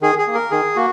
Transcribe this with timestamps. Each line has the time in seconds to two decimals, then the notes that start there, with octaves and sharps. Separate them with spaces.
0.02 D#3 G#4
0.18 G#4
0.28 A#3
0.35 A#4
0.51 D#3 G#4
0.76 A#3 F#4